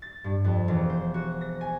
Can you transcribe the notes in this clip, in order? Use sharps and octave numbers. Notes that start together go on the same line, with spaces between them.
A6
G2
F2
E1
C5
F#4
A#6
G#5